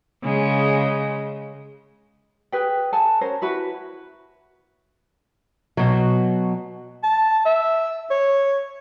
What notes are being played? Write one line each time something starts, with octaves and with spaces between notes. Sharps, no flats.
C#3 G#3
G#4 B4 G5
A4 F#5 G#5 A5
C#4 A#4 C5
E4 F#4 B4
B2 F#3
A5
E5
C#5